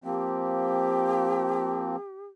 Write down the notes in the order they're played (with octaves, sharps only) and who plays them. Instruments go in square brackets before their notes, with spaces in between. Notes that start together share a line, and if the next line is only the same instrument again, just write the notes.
[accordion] F3 A#3 C4 [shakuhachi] G4